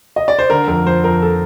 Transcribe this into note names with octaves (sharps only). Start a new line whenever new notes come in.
D#5
D5
C5
D3 A#4
F2 A#4
F3 C5
F2 A#4
A4